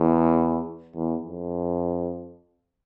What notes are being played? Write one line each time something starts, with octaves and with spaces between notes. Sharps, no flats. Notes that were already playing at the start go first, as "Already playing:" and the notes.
Already playing: E2
E2
F2